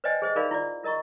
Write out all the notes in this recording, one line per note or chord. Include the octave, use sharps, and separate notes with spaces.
B4 C5 D5 D#5 G5 G#5
G#4 C5 D#5
D#4 G#4 A#4 D5 F5 B5
E4 F4 D5
E4 A#4 D#5 A#5 C#6